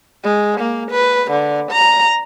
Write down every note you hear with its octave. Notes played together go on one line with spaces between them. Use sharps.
G#3
A#3
B4
D3
A#5